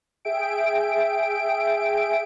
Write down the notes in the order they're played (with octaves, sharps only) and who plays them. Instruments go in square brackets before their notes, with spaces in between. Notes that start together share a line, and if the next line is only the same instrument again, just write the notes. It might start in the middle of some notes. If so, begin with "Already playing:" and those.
[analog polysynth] G#4 E5 G5 D7